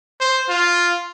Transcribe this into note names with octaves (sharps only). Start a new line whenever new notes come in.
C5
F4